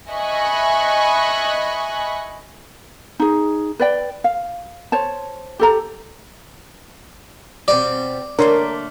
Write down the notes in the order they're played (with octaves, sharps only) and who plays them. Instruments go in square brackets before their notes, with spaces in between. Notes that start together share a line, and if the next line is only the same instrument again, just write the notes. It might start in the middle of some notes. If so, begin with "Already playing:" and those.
[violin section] D#5 E5 G#5 B5 C#6 F#6
[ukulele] D#4 G#4
B4 D5 G5
F5
C5 C#5 A5
G4 A4 A#5
[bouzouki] B2 G3 C4 [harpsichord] D5
[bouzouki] D3 A3 A#3 [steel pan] D4 C#5 C6 [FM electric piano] A#4